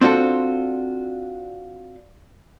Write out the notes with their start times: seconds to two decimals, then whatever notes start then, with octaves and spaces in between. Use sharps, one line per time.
0.01 C4 D4 F4 F#4 A4